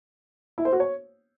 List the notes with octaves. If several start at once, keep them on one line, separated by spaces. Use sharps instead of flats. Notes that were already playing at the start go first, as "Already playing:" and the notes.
E4
C5
F#4
C#5